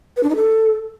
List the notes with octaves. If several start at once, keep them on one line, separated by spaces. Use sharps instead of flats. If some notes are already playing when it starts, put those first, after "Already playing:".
B4
D4
D#4
A4